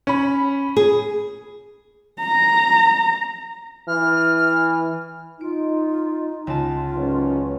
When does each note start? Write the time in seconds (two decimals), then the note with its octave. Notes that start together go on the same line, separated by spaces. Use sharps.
0.07 C#4 B5
0.77 G#4
2.21 A#5
3.88 E3 F6
5.41 D#4 F4 D7
6.47 C#2 F4 A5
6.96 F#1 G#2 C#4 B4